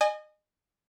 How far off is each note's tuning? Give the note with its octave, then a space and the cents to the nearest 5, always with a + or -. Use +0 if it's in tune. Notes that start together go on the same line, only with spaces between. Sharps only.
D#5 -30 G#5 +0